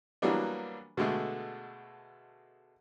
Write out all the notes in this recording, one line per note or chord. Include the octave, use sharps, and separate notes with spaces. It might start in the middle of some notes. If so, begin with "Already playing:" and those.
E3 F#3 G3 A#3 B3 D4
B2 D3 G#3 A3